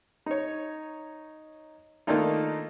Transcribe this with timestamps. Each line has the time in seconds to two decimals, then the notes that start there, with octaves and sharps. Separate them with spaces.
0.26 D#4 C#5
2.07 D#3 A3 A#3 D4 D#4 F4